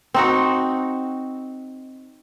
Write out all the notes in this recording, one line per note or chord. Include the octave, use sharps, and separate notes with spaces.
C4 D#4 F#4